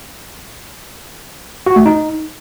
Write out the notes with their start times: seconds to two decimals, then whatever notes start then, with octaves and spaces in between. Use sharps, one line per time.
1.66 F#4
1.76 A3
1.86 D#4